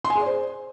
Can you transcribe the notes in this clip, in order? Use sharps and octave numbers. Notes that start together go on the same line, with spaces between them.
C6
G#5
G#4
D5
C5